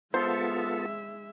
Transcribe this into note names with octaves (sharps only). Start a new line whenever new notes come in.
G#3 B3 F4 A4 C5 E5